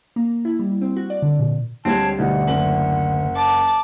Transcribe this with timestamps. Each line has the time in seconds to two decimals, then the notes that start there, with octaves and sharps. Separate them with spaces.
0.16 A#3
0.45 E4
0.59 G3
0.81 C4
0.96 F#4
1.10 D5
1.22 D3
1.40 A#2
1.85 D2 G3 G#3 C4 C#5 A5
2.19 D2 B2 G3 D#4 F#5
2.47 F#1 F#7
3.35 A5 D6